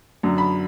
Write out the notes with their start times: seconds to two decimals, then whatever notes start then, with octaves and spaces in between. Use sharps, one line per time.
0.23 F#2 D3 F#3
0.38 B5